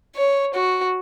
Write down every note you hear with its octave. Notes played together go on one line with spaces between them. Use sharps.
C#5
F#4